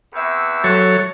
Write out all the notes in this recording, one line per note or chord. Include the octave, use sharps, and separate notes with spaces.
E2 C4 E5
F#3 A4 C#5